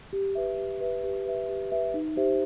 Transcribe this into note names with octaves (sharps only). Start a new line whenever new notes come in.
G4
B4 E5
G4
B4 E5
G4
B4 E5
G4
B4 E5
D#4
G4 C5 E5